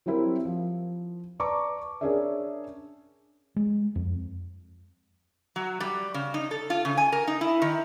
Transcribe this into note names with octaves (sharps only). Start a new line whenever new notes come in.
F#3 G3 C4 E4 A#4
F3
B4 D5 A5 A#5 C#6 D6
C#4 D4 G#4 A#4 D5 E5
G#3
F2
F#3
G3
C#3
D#4
A4
F4
C#3
G#5
A#4
D#4
E4
D#3